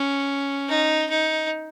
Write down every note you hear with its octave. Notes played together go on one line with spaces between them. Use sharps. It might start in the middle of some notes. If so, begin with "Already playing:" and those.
Already playing: C#4
D#4
D#4